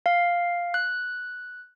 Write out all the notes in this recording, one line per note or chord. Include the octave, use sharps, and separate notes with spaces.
F5
F#6